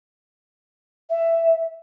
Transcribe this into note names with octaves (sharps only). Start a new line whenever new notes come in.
E5